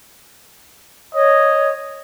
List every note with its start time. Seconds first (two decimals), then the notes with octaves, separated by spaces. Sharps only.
1.15 C#5 D#5